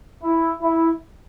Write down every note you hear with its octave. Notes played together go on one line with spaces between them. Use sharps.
E4
E4